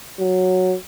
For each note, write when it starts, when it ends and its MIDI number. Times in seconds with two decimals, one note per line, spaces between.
0.19 0.75 54